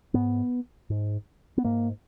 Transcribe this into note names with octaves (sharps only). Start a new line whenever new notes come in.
G#2 B3
G#2
B3
G#2 A#3